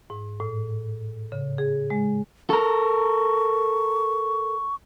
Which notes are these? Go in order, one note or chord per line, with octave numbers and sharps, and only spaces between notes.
G#2
A2
C#3
G#4
G#3
A4 A#4 C#6